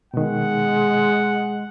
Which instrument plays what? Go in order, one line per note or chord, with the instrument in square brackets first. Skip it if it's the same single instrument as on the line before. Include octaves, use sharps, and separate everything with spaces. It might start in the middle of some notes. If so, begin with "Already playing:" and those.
[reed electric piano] B2 D#3 [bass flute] G#3 [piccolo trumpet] F#5